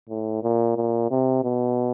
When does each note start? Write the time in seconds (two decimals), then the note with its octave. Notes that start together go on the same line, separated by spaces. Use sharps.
0.09 A2
0.43 A#2
0.76 A#2
1.11 C3
1.44 B2